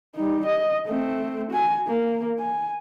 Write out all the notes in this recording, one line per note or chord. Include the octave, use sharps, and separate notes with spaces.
G3 D#4
D#5
A3 C4
F#4 G#5
A#3
G#5